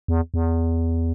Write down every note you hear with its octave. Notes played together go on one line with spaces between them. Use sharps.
E2
E2